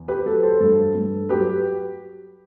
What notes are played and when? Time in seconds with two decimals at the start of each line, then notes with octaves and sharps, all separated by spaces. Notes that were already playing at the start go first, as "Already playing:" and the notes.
Already playing: E2
0.08 G4 B4
0.26 F#3 A4
0.43 A4 C5
0.60 G2 A4
0.95 G2
1.29 F#3 G4 B4